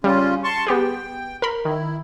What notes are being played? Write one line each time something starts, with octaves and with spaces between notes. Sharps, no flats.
C#3 G3 C#4 F4
A5 C6 C#6
B3 G4 G#4 G5
A#4 B5
D#3 E4